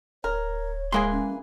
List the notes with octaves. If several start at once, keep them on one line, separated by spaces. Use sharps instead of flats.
D1 A#4 C#5
E3 G#3 A#3 G#4 C6
C#4